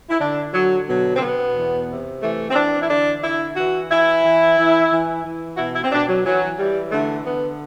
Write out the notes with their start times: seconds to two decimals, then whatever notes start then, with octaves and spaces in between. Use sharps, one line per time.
0.10 E4
0.20 D3 D4
0.54 D3 F#3
0.87 B2 F#3
1.16 C4
1.21 B2 B3
1.55 E2
1.89 C3
2.22 E3 A3
2.50 C4
2.55 E3 D4
2.81 E4
2.89 D3 D4
3.23 D3 E4
3.56 E3 F#4
3.90 E3 E4
4.23 E3
4.57 E3
4.91 E3
5.24 E3
5.53 F#4
5.58 B2 E4
5.75 E4
5.83 C4
5.92 B2 D4
6.08 F#3
6.25 E3 F#3
6.58 E3 G3
6.91 D3 A3
7.25 D3 B3